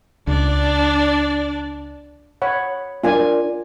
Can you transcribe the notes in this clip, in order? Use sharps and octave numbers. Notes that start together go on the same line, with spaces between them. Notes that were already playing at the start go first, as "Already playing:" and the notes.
C#2 D4 D5
C#5 F#5 B5
D4 F4 A#4 D5 G#5